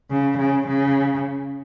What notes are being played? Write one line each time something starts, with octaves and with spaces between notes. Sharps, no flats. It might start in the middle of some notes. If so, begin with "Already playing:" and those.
C#3
C#3
C#3